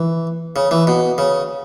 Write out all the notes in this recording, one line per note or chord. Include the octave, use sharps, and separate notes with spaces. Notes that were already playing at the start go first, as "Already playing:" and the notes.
Already playing: E3
C#3
E3
B2
C#3